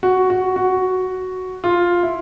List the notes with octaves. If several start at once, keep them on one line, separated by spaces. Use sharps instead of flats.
F#4
F#4
F#4
F4
E4